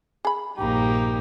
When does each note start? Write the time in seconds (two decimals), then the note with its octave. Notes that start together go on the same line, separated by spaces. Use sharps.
0.25 G#4 B5
0.57 A#1 G2 A#3 D#4 G4